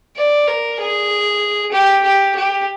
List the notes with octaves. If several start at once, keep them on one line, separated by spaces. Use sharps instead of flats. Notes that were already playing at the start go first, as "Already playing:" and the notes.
D5
A#4
G#4
G4
G4
G4